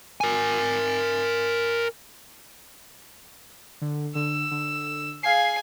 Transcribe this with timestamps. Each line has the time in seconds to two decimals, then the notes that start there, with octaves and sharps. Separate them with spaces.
0.21 A#4 G#5
3.81 D3
4.15 D3 E6
4.51 D3
5.23 G#4 F5 G#5 C7